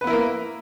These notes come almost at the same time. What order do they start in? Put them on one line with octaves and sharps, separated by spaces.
B4 B3 E4 A#4 A#3